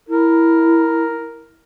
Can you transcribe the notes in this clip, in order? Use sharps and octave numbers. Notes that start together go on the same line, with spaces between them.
E4 A#4